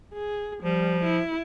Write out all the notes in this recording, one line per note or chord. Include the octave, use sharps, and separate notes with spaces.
G#4
F3 G3
E4